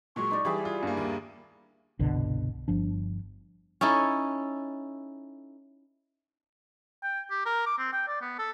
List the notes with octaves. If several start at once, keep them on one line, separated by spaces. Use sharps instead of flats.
A#2 F#3 G#3 C#6
D#4 D5
E3 G3 E4 G4 G#4
F4 F5
G2 A#3
D#2
G1 C2 B2 D3
G1 F3 D4
C#4 D#4 E4 A4
G5
G4
A#4
D6
C4
G5
D5
B3
A4